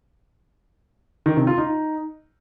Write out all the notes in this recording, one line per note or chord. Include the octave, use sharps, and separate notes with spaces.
D#3
C3
F4
D#4